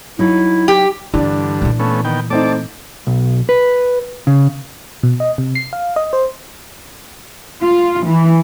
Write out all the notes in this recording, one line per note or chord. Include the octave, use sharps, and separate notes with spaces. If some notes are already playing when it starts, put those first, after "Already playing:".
F#3 D#4 E4
G4
G2 D3 E3 D4
A#2 E3
A3 B3 C#4
D#3 B3 G5
A3 C4 D#4 D5 A5 D6
B1
B4
C#3
B2
D#5
C3
C7
F5
D#5
C5
F4
E3